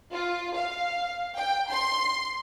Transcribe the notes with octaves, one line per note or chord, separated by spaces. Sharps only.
F4
F5
G5
C6